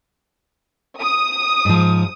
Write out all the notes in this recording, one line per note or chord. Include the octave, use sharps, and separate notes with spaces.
D#6
G#2 F3